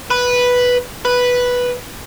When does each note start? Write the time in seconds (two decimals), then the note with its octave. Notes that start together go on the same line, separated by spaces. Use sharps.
0.10 B4
1.05 B4